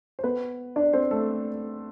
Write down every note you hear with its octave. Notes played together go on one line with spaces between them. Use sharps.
C5
B3 B4
D4 D5
C4 C5
A3 A4